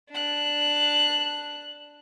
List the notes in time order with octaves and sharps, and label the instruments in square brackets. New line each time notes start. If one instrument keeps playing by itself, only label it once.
[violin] D4 F#6